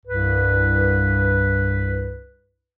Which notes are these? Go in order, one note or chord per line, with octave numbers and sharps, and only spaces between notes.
C2 G2 B4